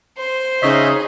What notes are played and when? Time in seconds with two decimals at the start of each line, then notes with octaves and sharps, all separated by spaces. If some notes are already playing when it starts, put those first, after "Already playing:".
0.18 C5 C6
0.62 C#3 D#4 G#4 C#5 D#5 E5